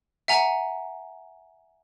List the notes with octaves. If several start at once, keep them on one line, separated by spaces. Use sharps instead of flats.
E5 F#5 G#5 A#5